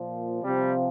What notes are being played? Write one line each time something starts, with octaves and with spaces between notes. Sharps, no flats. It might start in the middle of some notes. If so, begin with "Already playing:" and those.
Already playing: A#2 F3
C3 F3 G3